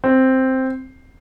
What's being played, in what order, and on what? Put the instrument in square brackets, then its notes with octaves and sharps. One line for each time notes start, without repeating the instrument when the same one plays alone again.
[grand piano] C4